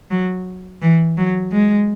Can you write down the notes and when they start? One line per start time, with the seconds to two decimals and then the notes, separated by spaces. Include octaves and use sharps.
0.11 F#3
0.82 E3
1.18 F#3
1.52 G#3